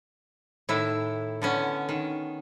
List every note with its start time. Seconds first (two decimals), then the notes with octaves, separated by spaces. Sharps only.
0.69 A2 D#3 E4
1.42 D3 B3 C#4
1.89 D#3